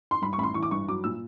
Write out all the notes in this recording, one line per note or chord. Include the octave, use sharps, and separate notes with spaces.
C6
G2 B5
C#6
A1 B5
C6
E3 C#6
D6
G2 C#6
F#3 D6
A#2 E6